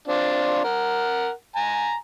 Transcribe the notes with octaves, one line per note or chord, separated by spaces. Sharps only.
C4 D4 F4
A#4 F#5
G#5 A#5